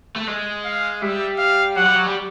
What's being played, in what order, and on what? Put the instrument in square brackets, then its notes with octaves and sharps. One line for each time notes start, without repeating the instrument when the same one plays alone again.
[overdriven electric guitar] A3
G#3
[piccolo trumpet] F5
[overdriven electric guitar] G3 [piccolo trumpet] E5
[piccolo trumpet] F5
[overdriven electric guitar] F#3 [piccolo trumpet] F#5
[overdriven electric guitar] G3
F#3
G3